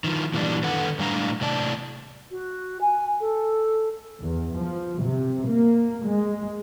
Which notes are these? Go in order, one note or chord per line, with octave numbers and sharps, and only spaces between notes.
D#3 F3
A#2 E3 G3 D4
D3 D#3 A4 B4 F#5
A2 G3 D4 F5 G5 A#5
A2 C3 D5 A5
F#4
G#5
A4
E2
F3
C3
A#3
G#3